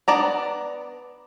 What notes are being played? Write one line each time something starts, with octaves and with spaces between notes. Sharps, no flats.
B3 D4 D5 A#5